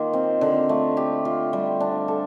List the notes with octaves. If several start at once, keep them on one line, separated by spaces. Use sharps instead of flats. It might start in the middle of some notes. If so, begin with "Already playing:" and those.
Already playing: D#3 A#3 F4
C4
D3
A3
G4
F4
G3
D4
A4